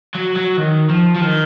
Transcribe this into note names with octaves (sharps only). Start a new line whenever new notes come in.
F#3
F#3
D#3
F3
F3
D#3